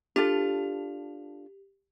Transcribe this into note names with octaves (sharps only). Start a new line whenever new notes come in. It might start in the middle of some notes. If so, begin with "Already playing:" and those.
D4 F4 G4 A4